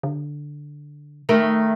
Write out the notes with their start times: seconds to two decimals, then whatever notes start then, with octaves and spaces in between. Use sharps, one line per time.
0.03 D3
1.29 D#3 A3 A#4